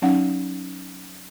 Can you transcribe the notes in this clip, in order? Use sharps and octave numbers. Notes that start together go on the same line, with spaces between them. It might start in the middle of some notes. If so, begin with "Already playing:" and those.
F#3 C#4 D#4 F5 F#5